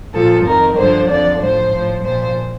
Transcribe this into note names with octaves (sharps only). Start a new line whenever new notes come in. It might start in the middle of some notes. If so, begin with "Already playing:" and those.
A#2 F3 A4
F2 D#3 A#4
G2 D3 F3 C5
F2 D3 F3 D5
A2 F3 C5
A2 F3
A#2 F3 C5